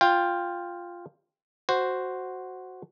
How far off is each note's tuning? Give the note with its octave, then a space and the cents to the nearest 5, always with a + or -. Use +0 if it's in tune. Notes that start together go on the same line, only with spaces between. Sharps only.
F4 +0 G5 +10
F#4 +0 C5 +0